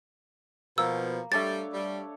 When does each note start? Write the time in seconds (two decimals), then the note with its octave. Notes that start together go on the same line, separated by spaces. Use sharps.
0.78 B2 F3 A#3 E6
1.32 G3 A3 D4 C#5 A6
1.74 G3